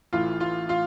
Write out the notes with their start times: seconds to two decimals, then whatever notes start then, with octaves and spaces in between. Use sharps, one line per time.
0.13 A1 A2 E3 F4 F5
0.40 F4 F5
0.69 F4 F5